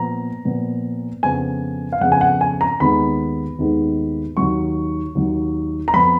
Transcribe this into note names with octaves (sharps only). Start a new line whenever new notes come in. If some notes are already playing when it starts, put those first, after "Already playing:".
Already playing: A#2 F3 B3 A#5
A#2 F3 B3
F2 C#3 F3 B3 G#5
F5
F2 C#3 F3 B3 F#5
G#5
F#5
G#5
A#5
D#2 D#3 G#3 B3 B5
D#2 D#3 G#3 B3
D#2 D#3 F#3 C#6
D#2 D#3 F#3
A#5
F2 F3 B3 B5